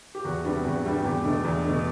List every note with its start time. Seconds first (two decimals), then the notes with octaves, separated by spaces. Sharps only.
0.15 G4
0.24 E2 F#4
0.45 C3 G3 B3 D4
0.64 E2 F#4
0.84 C3 G3 B3 D4
1.04 E2 G4
1.25 B2 A3 D4
1.44 E2
1.65 B2 A3 D4